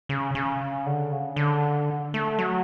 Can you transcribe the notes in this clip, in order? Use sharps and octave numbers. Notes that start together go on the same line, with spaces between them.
C#3
C#3
D3
C#3
D3
A3
F#3